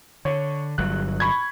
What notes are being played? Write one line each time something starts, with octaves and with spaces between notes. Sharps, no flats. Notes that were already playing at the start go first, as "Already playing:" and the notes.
D3 C#5
G1 G2 F#3 F#6
B5 C#6 G#6